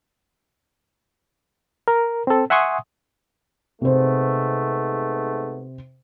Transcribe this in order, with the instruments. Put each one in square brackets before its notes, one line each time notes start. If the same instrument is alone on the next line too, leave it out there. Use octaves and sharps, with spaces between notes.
[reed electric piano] A#4
C4 A4
E5 F#5 G#5 C6 C#6 D#6
[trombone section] G#2 A3 B3 [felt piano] C3 C5